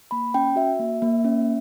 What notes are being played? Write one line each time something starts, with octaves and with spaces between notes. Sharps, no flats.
A#3 B5
C#4 G5
F#4 E5
A#3
A#3
C#4